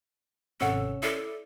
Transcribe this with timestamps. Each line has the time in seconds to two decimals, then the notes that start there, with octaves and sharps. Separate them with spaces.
0.60 G#1 C3 C#4 A4 C#5 F#5 E6
1.03 E4 A4 D5